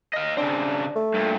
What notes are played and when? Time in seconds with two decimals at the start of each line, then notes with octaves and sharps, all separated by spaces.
0.14 D#5 F5
0.37 C#3 C4 D4
0.96 A3
1.14 G2 A#2